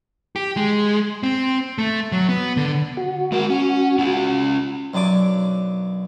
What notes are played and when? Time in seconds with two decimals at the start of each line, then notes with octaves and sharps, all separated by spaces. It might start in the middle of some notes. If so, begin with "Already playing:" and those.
0.36 G4
0.57 G#3
1.23 C4
1.78 A3
2.12 F#3
2.29 B3
2.57 D3
2.97 F#4
3.32 G#3 A#4
3.50 C#4
3.99 C#4 F4
4.93 B1 F#2 D4 D6